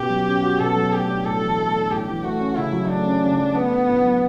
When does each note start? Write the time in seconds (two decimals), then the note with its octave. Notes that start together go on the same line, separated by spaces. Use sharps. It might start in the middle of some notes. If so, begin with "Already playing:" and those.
Already playing: B2 C#4 F#4 G4
0.09 F#3
0.26 C#4
0.43 F#4
0.59 B2 A4
0.76 F#3
0.92 A3 G4
1.08 D4
1.25 A2 A4
1.41 E3
1.58 A3
1.74 D4
1.91 A2 G4
2.07 E3
2.23 A3 F#4
2.40 C#4
2.56 C#3 E4
2.72 F#3
2.89 A3 D4
3.05 C#4
3.22 C#3
3.38 F#3
3.55 A3 B3
3.71 D4
3.88 A2
4.04 F#3